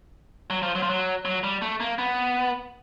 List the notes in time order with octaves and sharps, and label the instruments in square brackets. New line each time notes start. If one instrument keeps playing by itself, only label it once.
[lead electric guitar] F#3
F3
F#3
F3
F#3
F#3
G3
A3
A#3
B3